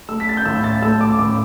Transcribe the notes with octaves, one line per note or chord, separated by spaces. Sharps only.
A3 E6
B6
A6
G6
A2 E6
A6
A3 E6
D6
A2 D6